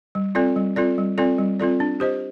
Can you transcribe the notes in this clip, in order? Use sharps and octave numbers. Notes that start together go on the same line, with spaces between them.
G3
C4 F4 A4 D5
G3
C4 F4 A4 D5
G3
C4 F4 A4 D5
G3
C4 F4 A4 D5
D4
G4 C5 D#5